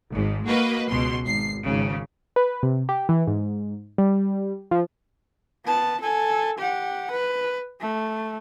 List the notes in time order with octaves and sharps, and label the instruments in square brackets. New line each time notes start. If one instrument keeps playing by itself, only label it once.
[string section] G#1 G#2
A#3 F#4 B4 D#5
C#2 B2 C6
G#1 C7
G#1 C#3
[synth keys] B4
C3
G4
E3
G#2
G3
F3
[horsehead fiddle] B3 A5
A4 G#5
G4 F#5
B4
A3